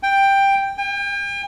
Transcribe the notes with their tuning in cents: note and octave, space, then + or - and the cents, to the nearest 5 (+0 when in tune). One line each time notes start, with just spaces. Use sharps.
G5 +5
G5 +40